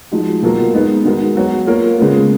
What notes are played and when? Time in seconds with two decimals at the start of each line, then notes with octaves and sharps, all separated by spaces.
0.12 F3 G#3 D#4 F#4
0.43 B2 F#3 A#3 F4 A#4
0.74 G#3 B3 D#4
1.05 D#3 G#3 B3 F#4 A#4
1.35 F#3 B3 F#4 C#5
1.67 A#3 F4 A#4 C#5
1.98 C#3 G#3 B3 F4